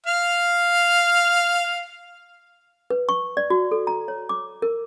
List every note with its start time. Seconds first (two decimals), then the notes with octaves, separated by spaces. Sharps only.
0.06 F5 F6
2.90 B4
3.09 C#6
3.37 D5
3.50 F#4
3.71 A4
3.87 A#5
4.08 C#5
4.29 D6
4.62 A#4